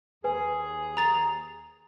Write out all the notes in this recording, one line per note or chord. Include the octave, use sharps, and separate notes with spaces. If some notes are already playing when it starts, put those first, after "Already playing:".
D#2 G#4 B4 G#5
A#5 A6 F7